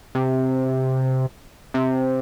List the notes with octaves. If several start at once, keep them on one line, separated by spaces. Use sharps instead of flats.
C3
C3